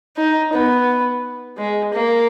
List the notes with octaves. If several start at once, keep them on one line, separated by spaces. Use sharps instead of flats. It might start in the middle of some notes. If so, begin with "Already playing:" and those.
D#4
B3
G#3
A#3